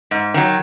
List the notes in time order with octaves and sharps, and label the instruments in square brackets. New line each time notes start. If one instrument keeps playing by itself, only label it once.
[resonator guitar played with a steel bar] G#2
D#3 F#3